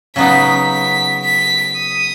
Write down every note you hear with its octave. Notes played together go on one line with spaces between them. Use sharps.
C#3 F#3 B3 D#4 B6
B6
B6
D#6